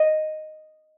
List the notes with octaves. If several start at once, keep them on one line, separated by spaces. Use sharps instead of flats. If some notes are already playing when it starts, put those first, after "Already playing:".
Already playing: D#5